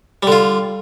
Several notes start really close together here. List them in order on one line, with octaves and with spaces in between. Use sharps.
G3 D3 F4